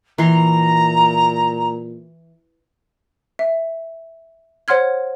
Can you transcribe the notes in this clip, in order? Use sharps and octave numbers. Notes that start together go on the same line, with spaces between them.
A#2 E3 A#5 C6
E5
C5 C#5 F#5 C6 F6 G#6